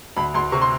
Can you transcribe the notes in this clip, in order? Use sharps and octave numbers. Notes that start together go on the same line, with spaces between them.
D2 B5
D2 C6
C3 C#6
C6